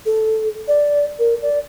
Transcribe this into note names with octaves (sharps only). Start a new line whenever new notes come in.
A4
D5
A#4
D5